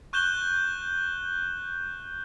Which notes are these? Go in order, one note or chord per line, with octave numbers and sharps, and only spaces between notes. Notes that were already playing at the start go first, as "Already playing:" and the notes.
C#6 F#6 G6 E7 G7